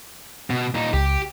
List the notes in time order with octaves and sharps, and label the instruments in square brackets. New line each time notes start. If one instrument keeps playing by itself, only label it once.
[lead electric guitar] B2
A#2 D#4
[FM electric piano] C#2 [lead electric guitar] G4